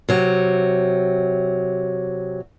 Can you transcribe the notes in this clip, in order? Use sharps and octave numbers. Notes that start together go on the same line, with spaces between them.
C3 F#3